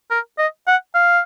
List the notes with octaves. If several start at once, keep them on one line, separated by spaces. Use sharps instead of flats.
A#4
D#5
F#5
F5